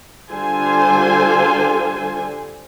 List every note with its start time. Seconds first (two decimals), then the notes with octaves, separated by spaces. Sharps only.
0.30 D3 G3 F4 A4 C5 G#5